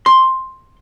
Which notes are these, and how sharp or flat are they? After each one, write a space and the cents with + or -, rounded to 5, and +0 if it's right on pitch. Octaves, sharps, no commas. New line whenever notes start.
C6 +5